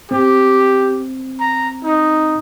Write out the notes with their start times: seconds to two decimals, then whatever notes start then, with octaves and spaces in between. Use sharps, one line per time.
0.11 C4 G4
1.40 A#5
1.84 D#4